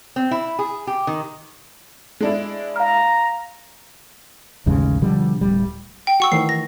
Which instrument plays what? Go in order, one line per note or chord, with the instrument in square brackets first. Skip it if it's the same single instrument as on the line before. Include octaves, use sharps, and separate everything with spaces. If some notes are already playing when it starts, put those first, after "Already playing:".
[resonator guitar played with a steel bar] C4
E4
G#4
G4
D#3
[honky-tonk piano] G#3 D4 E4
[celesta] F5 F6 [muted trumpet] A#5
[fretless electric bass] A1 D#2 C#3 G#3
B2 D3 F3 G3
D1 G3
[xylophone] G5
[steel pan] F#4 [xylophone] F#5 C#6 E6
[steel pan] D#3 E3 A3 [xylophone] C7
[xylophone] A#6